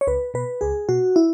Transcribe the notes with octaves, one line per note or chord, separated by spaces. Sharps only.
C#5
C#2 B4
B2 B4
C#2 G#4
B2 F#4
E4